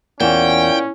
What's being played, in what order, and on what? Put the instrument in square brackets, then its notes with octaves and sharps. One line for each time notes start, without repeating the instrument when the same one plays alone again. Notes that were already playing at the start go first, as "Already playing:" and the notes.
[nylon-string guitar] E2 [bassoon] A#2 [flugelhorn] C#4 [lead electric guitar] G5